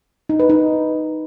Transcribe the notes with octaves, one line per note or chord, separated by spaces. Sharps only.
D#4
B4
D#4